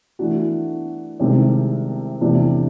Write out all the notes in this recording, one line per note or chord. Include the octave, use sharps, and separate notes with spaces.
E3 A3 D4 F#4
C2 C3 D#3 G#3 C4
E2 C3 E3 A3 D4